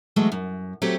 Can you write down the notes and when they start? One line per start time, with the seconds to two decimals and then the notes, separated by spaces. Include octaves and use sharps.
0.16 E3 F#3 G#3 A3
0.32 F#2
0.82 F#3 A3 C4 G4